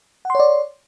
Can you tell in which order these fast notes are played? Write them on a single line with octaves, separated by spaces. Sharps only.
F#5 C6 C#5 D5